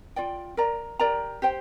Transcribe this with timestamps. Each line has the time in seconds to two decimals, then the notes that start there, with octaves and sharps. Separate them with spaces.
0.16 F4 D5 G5
0.57 A#4 D5 A#5
0.99 G4 A#4 D5 A#5
1.42 G4 C5 G5